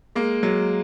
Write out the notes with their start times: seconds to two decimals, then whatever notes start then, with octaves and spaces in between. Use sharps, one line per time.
0.15 G#3 A#3
0.43 F#3 G#3